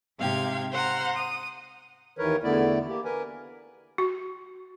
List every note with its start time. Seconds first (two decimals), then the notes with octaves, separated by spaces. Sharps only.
0.18 G#2 C3 F5 G5 G#6
0.72 C5 F#5 A#5 F6
1.15 D#6
2.18 D#2 D#3 E3 A#4 B4 C#5
2.44 E2 D3 A3 B3 E4 D5
2.88 A#3 G4
3.05 A#4 B4 G#5
3.98 F#4